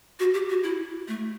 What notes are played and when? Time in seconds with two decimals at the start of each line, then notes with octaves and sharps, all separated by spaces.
0.19 F#4
0.34 G4
0.49 F#4
0.63 E4
1.08 A3